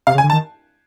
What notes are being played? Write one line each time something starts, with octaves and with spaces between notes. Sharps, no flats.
C3 F5
C#3
G#5
D3
A5
D#3